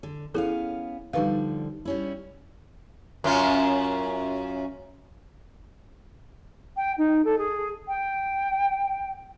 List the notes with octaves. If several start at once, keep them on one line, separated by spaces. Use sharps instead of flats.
D3
B3 C#4 E4 G#4 A4 F5
D3 F3 G3 D#4 B4 F5
G3 C#4 E4
F#2 C#4 F4
G5
D#4
A4
G#4
G5